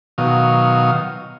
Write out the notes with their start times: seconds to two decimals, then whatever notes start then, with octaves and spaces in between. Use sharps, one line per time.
0.18 B2 D#3 F#3 F5 D#6